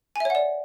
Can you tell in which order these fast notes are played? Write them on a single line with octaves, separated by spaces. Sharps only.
G#5 E5 C#5 F#5 D5